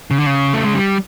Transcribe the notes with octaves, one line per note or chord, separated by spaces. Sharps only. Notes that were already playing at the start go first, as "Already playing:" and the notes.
C#3
D3
C#3
A3
G#3
G3